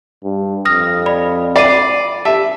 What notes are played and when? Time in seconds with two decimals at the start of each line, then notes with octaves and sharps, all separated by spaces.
0.23 G2
0.65 F2 D#6 F6 A#6
1.06 D5 B5
1.56 D5 B5 C7 D#7
2.25 G4 E5 A5